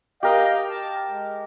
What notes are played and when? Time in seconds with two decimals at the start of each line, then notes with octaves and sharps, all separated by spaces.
0.23 G4 A#4 D#5 F5 G5
0.69 A5
1.08 G#3